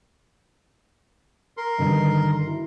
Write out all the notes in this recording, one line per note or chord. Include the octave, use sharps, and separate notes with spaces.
A#4 C6
G2 D3 D#3
E4